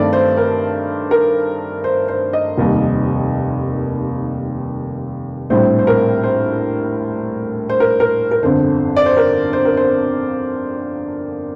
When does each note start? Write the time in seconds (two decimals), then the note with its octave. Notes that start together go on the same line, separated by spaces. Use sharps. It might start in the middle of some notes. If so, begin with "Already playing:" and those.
Already playing: G2 D#3 A3 C4 D5
0.13 C5
0.37 A#4
1.11 A#4
1.84 C5
2.08 C5
2.33 D#5
2.58 F1 D#2 D#3 G3
5.50 A#1 A2 G3 C4 C5
5.79 C5
5.87 A#4
6.24 C5
7.70 C5
7.80 A#4
8.00 A#4
8.31 A#4
8.43 G1 F2 D3 C5
8.96 D5
9.06 C5
9.17 A#4
9.53 C5
9.65 A#4
9.77 C5